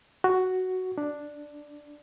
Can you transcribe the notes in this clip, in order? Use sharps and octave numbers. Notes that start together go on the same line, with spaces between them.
F#4
D4